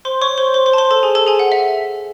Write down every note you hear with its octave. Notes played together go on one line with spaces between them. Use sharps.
C5 C6
C#5 C#6
C5 C6
C5 C6
C5 C6
A5
C5 C6
A4 A5
G#4 G#5
A4 A5
G#4 G#5
F#5
E5